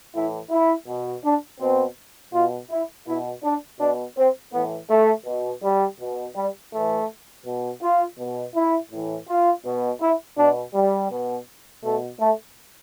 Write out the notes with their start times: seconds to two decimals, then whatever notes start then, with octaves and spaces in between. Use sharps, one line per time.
0.14 A2 E3 E4
0.50 E4
0.87 B2
1.23 D4
1.60 B2 C4
2.32 B2 F4
2.70 E4
3.06 B2 E4
3.43 D4
3.79 B2 D4
4.16 C4
4.52 A2 E3 B3
4.89 A3
5.25 B2
5.62 G3
5.99 B2
6.35 G3
6.72 A2 E3 A3
7.45 B2
7.81 F4
8.18 B2
8.55 E4
8.91 A2 E3
9.28 F4
9.64 B2
10.01 E4
10.37 B2 D4
10.73 G3
11.10 B2
11.83 B2 A3
12.20 A3